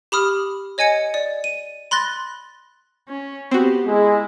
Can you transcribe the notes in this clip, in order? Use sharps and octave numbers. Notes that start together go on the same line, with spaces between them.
G4 B5 D#6 F6
C#5 D#5 G#5 G#6 C#7
D5
D#7
B5 C6 F#6 A6 A#6
C#4
B3 C4 F#4 G4
G#3 E4 G#4